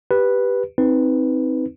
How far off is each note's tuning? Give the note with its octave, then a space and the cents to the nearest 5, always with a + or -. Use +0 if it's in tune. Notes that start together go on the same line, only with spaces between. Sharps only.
G4 +0 B4 -5
C4 +0 D#4 +20 B4 +0